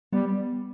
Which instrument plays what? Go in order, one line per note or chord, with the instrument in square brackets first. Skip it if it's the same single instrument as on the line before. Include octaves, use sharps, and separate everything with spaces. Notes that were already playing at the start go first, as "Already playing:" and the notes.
[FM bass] G3 [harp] B3